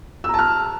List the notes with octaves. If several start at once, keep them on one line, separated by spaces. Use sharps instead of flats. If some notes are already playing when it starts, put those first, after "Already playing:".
A5 A#5 E6 F6